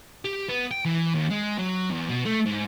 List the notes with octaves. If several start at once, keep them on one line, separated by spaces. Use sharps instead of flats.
G4
B3
G5
E3
D#2
G#3
F#3
E2
B2
A3
G#2